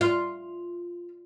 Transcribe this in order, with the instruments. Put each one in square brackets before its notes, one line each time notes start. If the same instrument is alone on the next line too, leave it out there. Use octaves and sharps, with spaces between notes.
[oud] F4